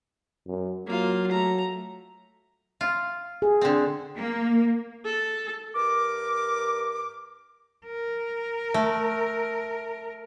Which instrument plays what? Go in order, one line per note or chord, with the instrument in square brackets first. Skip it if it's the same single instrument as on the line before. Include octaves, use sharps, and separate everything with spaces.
[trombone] F#2
[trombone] F#3 [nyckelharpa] A#3 F4
[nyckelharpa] A3 A#5
[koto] F4
[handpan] G#4
[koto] D3 C4
[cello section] A#3
[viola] A4
[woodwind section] G2 A#4 D6
[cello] A#4
[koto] A3